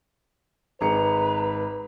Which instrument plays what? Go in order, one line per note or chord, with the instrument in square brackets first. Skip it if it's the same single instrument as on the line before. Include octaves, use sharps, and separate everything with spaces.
[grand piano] G#1 G#4 C#7 [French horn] B4 [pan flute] A#5